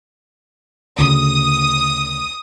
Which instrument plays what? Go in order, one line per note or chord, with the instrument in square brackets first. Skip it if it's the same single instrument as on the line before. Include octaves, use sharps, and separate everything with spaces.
[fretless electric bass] D2 C#3 [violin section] D#6